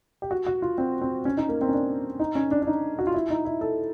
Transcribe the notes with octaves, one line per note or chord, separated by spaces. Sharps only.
G4
F#4
F#4
F4
C4
C4
C#4
D#4
A#3
C4
C#4
D4
D#4
C#4
D4
D4
D#4
F#4
F4
E4
D#4
E4
A4